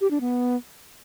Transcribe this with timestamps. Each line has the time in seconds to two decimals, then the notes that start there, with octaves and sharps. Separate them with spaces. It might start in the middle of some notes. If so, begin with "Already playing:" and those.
0.01 G4
0.11 D4
0.21 B3